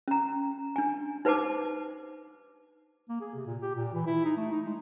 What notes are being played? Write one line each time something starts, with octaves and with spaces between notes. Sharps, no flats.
C#4 A#5
D4 G#5
D#4 B4 C5 A5 D6
A#3
G#4
C3
A#2
G4
A#2
E3
E4
D#4
A3
D#4
G#3